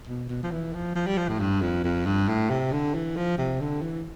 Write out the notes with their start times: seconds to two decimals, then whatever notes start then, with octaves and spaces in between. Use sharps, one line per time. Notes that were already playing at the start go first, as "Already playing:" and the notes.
0.07 B2
0.29 B2
0.43 F3
0.51 E3
0.73 F3
0.95 F3
1.06 G3
1.18 F3
1.28 A2
1.39 G2
1.61 F2
1.84 F2
2.06 G2
2.28 A2
2.50 C3
2.72 D3
2.94 E3
3.16 F3
3.38 C3
3.60 D3
3.82 E3